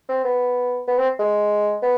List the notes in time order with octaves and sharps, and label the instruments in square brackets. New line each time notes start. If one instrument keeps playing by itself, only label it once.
[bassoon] C4
B3
B3
C4
G#3
B3